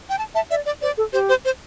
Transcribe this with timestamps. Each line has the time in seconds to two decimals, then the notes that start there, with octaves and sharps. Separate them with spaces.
0.09 G5
0.19 A5
0.35 E5 A5
0.51 D5 E5
0.66 D5
0.82 C5 D5
0.97 A4
1.13 G4 C5
1.29 C5
1.45 C5